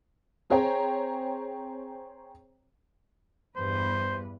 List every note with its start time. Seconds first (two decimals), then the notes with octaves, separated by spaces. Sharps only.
0.50 C4 G#4 C5 C#5 G5 A#5
3.56 E2 G2 B4 C5